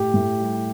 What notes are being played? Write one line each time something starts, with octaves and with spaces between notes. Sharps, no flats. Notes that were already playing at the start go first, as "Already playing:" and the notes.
Already playing: A2 G4
A2
G3